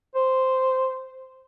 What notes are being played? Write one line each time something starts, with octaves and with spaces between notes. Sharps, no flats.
C5